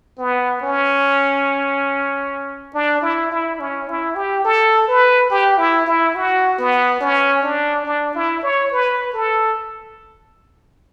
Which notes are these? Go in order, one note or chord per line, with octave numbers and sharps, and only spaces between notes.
B3
C#4
D4
E4
E4
C#4
E4
G4
A4
B4
G4
E4
E4
F#4
B3
C#4
D4
D4
E4
C#5
B4
A4